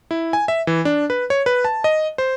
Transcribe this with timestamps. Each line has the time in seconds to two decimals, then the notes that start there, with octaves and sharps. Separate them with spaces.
0.11 E4
0.33 G#5
0.48 E5
0.67 E3
0.85 D4
1.10 B4
1.30 C#5
1.46 B4
1.65 A5
1.84 D#5
2.18 C5